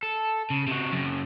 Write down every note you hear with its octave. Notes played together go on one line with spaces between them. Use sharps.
A4
C#3
C3 F#4
F#2 C#3